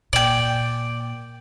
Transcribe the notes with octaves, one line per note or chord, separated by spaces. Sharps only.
A#2 D5 G5